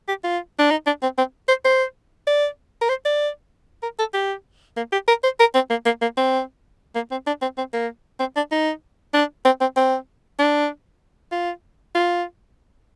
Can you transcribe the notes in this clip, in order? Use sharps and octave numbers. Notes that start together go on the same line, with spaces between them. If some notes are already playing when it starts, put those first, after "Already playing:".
G4
F4
D4
D#4
D4
C4
C4
C5
C5
D5
A#4
C5
D5
A#4
A4
G4
A#3
G4
A#4
C5
A#4
C4
A#3
A#3
A#3
C4
A#3
C4
D4
C4
C4
A#3
C4
D4
D#4
D4
C4
C4
C4
D4
F4
F4